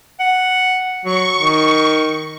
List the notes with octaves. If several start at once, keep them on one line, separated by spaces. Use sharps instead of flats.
F#5
F#3 C#6
D#3